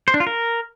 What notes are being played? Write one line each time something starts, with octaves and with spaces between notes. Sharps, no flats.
C5
D4
F4
A#4